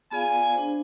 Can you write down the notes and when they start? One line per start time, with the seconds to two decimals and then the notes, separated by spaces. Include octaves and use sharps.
0.11 B3 F4 G#4 D5 F5 G#5
0.53 D4 G#4 C5